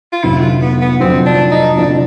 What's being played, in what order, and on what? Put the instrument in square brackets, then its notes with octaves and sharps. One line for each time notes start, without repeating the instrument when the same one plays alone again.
[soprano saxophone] F4
[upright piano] F1 F2 D3 F#3 [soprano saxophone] E4
[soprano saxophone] F4
B3
B3
[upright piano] F1 F2 D3 F#3 [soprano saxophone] C4
[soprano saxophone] D4
D#4
[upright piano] F1 F2 D3 F#3 [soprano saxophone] D4